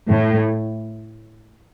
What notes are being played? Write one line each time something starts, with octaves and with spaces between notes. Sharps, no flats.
A2